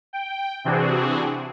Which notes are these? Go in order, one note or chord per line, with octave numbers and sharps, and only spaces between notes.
G5
C3 E3 C4 D4 F#4 G#4